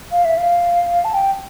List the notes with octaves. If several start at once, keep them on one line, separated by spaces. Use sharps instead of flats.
F5
E5
F5
A5
G5